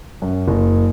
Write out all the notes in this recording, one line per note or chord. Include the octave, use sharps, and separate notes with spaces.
F#2
F#1